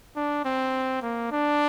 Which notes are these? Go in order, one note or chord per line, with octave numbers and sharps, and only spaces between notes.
D4
C4
A#3
D4